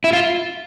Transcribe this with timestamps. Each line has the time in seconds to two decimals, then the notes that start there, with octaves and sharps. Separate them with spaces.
0.04 E4
0.13 F4